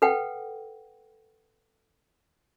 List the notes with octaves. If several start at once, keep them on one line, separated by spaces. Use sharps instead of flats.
A4 B4 F#5 G5